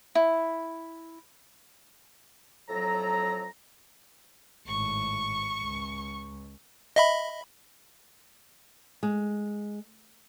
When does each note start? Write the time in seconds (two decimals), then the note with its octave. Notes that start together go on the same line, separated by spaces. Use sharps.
0.15 E4
2.69 F2 A2 F#3 A4 A#5
4.67 G#1 A2 C#6
5.61 C#2
6.96 D#5 E5 B5
9.03 G#3